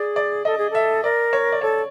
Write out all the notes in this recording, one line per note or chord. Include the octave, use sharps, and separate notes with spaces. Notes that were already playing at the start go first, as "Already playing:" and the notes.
Already playing: G#4 D5
D5
A4 D#5
G#4
A4 E5
A#4 D5
C#5
D5
A4 C#5